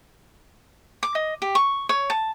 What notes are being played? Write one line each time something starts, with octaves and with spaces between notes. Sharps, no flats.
D6
D#5
G4
C#6
C#5
A5